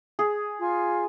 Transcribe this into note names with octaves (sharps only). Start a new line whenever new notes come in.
G#4
F4 G#5